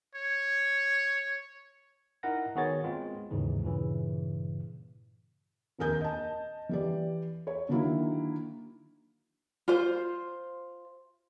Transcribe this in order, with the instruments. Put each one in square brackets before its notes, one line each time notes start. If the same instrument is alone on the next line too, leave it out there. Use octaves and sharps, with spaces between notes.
[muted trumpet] C#5
[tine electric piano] D#4 E4 A#4 F#5 A#6
D#3 B3 F#4 G#4 C#5 A6
G#3 B3 C4 F4
D#2 G#2 C#3 E3
G2 A#2 C#3 E3
[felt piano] F1 A#1 D#2 A#4 G#5 G6
D#5 A5
E3 G4 D5
C#5
D3 D#3 F#3 A#3 E4
[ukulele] F4 C5